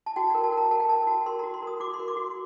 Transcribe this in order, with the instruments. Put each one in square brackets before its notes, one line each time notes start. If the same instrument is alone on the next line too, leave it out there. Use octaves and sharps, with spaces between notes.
[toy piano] A5
F#4 G5
A#4 G5
A5
A#4
A#5
A#4 A5
G5
A#4 A5
F#4
A#4 C6
F#4 A#5
C6
A#4 D#6
F#4 D6
C6
A#4
D6
F#4